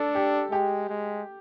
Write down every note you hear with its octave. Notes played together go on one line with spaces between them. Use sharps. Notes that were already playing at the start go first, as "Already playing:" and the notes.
Already playing: D4 A4
G4
G#3 G4
G#3